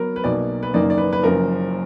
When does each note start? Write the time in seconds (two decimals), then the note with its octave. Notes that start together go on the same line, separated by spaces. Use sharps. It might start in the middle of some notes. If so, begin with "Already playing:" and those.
Already playing: F#3 B3 A#4
0.16 B4
0.24 B1 B2 A#3 D#4 D5
0.63 B4
0.74 F#1 F#2 D#3 A#3 D#4 D5
0.90 D5
0.98 B4
1.13 B4
1.23 F#1 F#2 F3 A#4